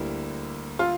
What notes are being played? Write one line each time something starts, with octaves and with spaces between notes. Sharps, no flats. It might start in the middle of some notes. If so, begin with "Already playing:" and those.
Already playing: D2 D3 G3 A#3 E4
F4